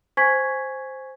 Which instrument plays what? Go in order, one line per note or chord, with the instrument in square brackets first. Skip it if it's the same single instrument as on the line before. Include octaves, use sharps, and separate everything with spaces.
[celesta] C5 G#5 C#6 G#6 B6